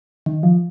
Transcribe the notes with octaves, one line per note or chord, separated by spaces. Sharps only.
D#3
F3